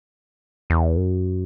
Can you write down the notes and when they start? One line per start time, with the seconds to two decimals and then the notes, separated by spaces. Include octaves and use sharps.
0.70 E2
0.97 F#2